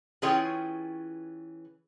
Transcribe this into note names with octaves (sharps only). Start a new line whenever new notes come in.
E3 C#4 F4 G#4 C#5 G5